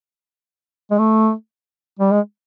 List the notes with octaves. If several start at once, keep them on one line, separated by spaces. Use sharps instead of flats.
G#3
A3
G3
G#3